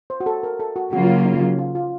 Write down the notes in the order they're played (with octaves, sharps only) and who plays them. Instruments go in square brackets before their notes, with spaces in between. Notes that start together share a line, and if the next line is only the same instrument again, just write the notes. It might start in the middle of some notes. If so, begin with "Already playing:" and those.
[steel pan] C5
F#4
A4
A#4
A4
F#4
[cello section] C#3 F#3 A#3 F4 [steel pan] F#4
[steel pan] D#4
F4
F4